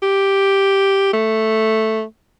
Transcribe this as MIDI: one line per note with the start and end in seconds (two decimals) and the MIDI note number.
0.02 1.09 67
1.13 2.03 57